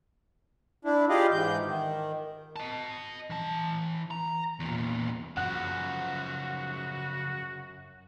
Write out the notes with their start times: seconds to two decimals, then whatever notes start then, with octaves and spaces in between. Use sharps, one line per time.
0.85 D4 E4
1.09 F4 G4 G#4 D5 D#5 F5
1.31 G#2 E3 G6
1.66 D#3
2.56 D#5 A5
3.30 E3 A5
4.11 A#5
4.60 E2 A#2
5.37 F#2 C#3 F3 F#4 F#5 F#6